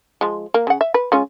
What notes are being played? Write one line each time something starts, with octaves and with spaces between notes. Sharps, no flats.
F3 G#3
A#3
C#3 F#5
E5
B4
G#3 C#4 F4